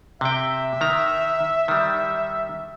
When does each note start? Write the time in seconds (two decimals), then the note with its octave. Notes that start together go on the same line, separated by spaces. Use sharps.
0.21 C3 E5 G5
0.81 D#3 A#5
1.68 D#3 G3